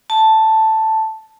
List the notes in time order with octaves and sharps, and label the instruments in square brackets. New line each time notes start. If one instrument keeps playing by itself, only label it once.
[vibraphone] A5